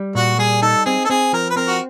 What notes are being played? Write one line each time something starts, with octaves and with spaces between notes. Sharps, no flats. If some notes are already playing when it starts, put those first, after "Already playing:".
Already playing: G3
A#2 F#4
G3 G#4
D#4 A4
C4 G#4
A4
C4 G#4
F3 A#4
B4
C4 A#4
F#4